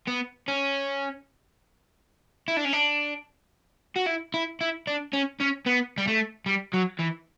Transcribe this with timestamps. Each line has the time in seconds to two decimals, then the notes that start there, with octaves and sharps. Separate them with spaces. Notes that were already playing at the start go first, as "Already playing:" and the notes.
0.08 B3
0.48 C#4
2.48 E4
2.57 D4
2.65 C#4
2.73 D4
3.96 F#4
4.07 E4
4.34 E4
4.61 E4
4.87 D4
5.14 C#4
5.41 C#4
5.66 B3
5.98 G3
6.07 A3
6.46 G3
6.74 F#3
6.99 E3